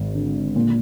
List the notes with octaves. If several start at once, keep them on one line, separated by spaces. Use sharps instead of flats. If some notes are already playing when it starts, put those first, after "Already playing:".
Already playing: G#1
D3
A#2